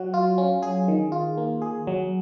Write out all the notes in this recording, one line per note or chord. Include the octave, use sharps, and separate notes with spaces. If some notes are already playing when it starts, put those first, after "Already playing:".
Already playing: F#3 F#4
F4
C#4
G#4
D#3
F4
A#3
G#4
F#3